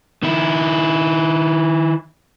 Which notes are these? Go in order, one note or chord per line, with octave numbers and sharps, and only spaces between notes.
D#3 E4